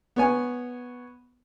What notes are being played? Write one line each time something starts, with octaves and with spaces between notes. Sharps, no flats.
B3 C#5 G#5